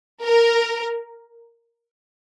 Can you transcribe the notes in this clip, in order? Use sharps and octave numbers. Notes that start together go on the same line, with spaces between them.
A#4